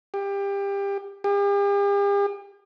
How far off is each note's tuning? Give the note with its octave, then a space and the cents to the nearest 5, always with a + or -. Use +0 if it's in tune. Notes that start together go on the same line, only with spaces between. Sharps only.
G4 +25
G4 +45